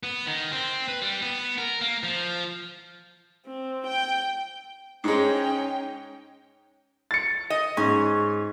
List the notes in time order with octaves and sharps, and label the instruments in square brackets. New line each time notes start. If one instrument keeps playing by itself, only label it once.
[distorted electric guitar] B3
D#3
C4
B4
G3
B3
A#4
A#3
F3
[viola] C4
G5
[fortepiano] G#2 G#3 [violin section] C#4 D#4 G5
[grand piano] A6 C#7
[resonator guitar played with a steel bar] D#5
[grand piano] G#2 [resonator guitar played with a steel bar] C#4